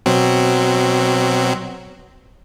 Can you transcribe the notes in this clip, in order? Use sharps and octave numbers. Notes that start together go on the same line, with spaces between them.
B2 F#3 C4